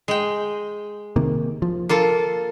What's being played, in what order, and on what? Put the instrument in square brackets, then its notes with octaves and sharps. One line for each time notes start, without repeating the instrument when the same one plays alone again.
[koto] G#3 G5
[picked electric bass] C3 D#3 A#3
F3
[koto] A#3 F4 A4